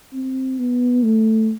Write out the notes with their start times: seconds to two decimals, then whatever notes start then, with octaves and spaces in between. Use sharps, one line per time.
0.14 C4
0.59 B3
1.05 A3